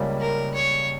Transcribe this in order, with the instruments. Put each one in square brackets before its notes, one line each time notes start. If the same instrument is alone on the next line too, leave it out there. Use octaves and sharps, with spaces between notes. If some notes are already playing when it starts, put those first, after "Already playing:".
Already playing: [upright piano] C#2 C#3 G3 A#3 C#4
[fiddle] A#4
C#5